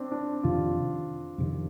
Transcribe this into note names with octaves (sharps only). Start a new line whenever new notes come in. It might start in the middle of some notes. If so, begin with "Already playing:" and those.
Already playing: C4 D4
D4
F2 C3 D#3 F4
F2 C3 D#3